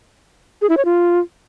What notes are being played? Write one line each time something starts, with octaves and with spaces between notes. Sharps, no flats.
G#4
E4
C#5
F4